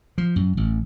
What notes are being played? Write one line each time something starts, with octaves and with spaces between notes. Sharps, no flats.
F3
F#2
A1